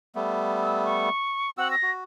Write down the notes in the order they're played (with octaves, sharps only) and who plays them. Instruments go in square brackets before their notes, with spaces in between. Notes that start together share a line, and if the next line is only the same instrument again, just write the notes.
[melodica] G3 A3 B3
[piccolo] E6
C#6
[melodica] C4 F#4 E6 [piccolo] F#5
[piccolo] A#6
[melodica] F#4